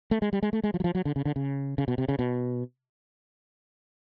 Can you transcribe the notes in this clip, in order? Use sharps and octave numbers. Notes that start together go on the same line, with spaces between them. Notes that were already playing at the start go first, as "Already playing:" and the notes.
A3
G#3
G3
G#3
A3
G#3
F3
F#3
F3
F#3
D3
C#3
D3
C#3
C#3
B2
C3
C#3
B2